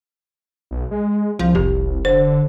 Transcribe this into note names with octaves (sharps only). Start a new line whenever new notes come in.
B1
G#3
C2 F3
F1 G4
D3 C5